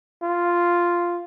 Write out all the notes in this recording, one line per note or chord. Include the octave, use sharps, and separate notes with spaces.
F4